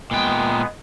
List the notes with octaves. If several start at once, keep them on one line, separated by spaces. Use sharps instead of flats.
A#2 G#3 B3 G5